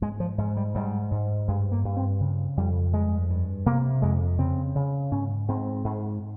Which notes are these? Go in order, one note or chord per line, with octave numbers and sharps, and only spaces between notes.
G#2 G#3
F3
G#2
G3
G#2 G3
G#2
G2 G#3
A#3
G2
C4
C#3
F2 G3
G2 G#3
G2
C3 A#3
F2 G#3
C#3 C4
C#3
G#2 C#4
G#2 C4
G#2